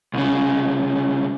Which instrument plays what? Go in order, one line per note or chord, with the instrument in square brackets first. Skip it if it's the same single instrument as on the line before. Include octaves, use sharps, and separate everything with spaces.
[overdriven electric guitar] C2 C#3